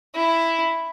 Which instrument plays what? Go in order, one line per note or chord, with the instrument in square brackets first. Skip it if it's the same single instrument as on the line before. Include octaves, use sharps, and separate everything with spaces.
[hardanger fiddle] E4